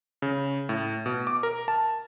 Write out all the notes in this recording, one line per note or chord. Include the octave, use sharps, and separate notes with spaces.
C#3
A2
B2
D6
A#4
A5